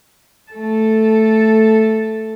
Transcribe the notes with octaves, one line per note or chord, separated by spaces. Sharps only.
A3 A4